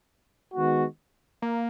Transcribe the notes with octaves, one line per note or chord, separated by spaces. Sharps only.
D#3 G#3 B3 F#4
A#3